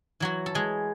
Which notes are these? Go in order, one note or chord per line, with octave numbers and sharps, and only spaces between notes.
E3 F#3 F#4
A4
E3 G#3 G#4